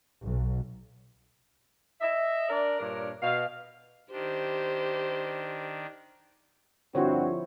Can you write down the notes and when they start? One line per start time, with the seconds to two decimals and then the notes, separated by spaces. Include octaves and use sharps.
0.23 B1
2.01 D#5 E5
2.49 D4 A#4 D5
2.80 G2 A#2 D4 A#4 C#5
3.22 B2 F5
4.12 D#3 D4 G4 C5
6.95 G2 D3 F3 C4 E4 F#4 C5 C#5